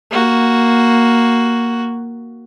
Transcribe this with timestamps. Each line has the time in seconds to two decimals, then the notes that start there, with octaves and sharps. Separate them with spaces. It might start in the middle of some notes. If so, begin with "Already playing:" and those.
0.11 A#3 F#4